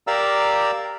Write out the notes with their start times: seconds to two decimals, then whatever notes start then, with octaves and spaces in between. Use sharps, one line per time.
0.07 G4 A#4 D5 F5 A#5 E6